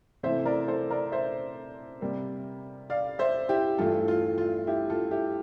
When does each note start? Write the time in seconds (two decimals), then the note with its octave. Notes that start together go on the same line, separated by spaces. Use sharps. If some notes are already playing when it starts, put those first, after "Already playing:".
0.23 C3 E3 A3 C5 E5
0.46 A#4 D5
0.68 A4 C5
0.91 A#4 D5
1.12 C5 E5
2.01 C3 G3 A#3
2.90 D5 F5
3.19 C5 E5
3.49 E4 G4
3.78 G2 E3 A3 F4 A4
4.08 F4
4.38 F4
4.67 E4 G4
4.90 F4 A4
5.11 E4 G4